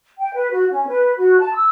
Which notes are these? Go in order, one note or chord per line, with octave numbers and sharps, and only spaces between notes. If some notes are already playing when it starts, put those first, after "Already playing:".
G5
B4
F#4
C#4
B4
F#4
A5
E6